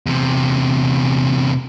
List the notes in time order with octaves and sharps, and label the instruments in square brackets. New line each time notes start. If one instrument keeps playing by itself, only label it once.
[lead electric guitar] E2 C3